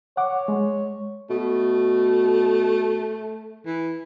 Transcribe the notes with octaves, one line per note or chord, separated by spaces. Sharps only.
C#5 F#5 D6
G#3
B2 A3
E3